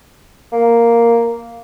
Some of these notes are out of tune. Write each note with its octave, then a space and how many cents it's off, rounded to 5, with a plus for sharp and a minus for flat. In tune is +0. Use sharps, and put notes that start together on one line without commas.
A#3 +0